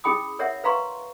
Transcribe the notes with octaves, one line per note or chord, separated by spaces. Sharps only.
C#4 E4 G#4 G5 B5 D#6
A#4 C#5 E5 F#5
B4 F5 A#5 C6 C#6